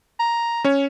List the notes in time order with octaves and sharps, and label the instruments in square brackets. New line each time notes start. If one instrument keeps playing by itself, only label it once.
[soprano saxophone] A#5
[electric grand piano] C#4 C#5